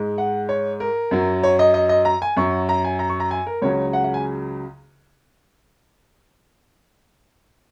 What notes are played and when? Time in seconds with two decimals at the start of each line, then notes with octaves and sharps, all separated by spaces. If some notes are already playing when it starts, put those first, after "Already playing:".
Already playing: G#2 G#3
0.18 F#5
0.49 C#5
0.80 A#4
1.11 F#2 F#3
1.43 C#5
1.59 D#5
1.74 D#5
1.89 D#5
2.05 A#5
2.22 G#5
2.37 F#2 F#3 C#6
2.69 A#5
2.84 G#5
2.99 A#5
3.10 C#6
3.20 A#5
3.31 G#5
3.47 A#4
3.62 C#2 C#3 F#3 C#5
3.93 F#5
4.04 F#5
4.14 G#5